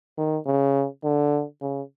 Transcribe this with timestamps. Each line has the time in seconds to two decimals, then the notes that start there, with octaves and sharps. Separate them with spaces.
0.18 D#3
0.46 C#3
1.04 D3
1.62 C#3